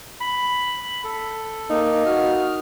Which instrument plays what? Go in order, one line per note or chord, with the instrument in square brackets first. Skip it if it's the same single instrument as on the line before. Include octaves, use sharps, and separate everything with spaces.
[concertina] B5
A4
[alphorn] A#3 [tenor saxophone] D#4
[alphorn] F#4 [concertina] F6